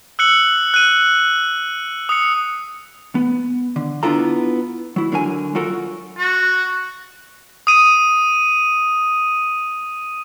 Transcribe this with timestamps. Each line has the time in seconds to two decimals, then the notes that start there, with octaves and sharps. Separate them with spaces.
0.19 E6 F#6 C#7 F#7
0.74 F#6 D#7
2.09 D#6 C#7
3.15 B3
3.76 D3
4.03 B3 D4 E4 F4 A4 A#5
4.96 F#3 E4
5.12 D3 F#3 A#4 G#5
5.55 F#3 F4 F#4 A4 A#4
6.18 F#4
7.67 D#6 D#7